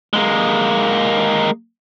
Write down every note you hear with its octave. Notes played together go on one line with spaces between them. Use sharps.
G#3 A#3